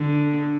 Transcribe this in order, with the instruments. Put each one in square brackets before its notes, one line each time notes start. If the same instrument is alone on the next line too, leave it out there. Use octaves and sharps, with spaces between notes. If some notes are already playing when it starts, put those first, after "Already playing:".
Already playing: [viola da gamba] D3